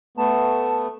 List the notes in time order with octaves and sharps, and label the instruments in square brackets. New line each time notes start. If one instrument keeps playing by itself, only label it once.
[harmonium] A3 B3 [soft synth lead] A5